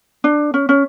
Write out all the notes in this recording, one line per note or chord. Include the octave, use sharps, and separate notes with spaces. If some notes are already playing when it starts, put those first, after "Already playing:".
D4
C#4
C#4